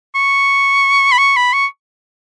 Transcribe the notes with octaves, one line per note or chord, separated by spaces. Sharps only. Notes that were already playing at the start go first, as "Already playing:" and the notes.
C#6
B5
C#6
B5
C#6